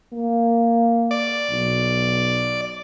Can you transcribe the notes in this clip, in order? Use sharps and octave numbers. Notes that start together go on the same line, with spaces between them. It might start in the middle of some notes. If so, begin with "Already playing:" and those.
A#3
D5
B1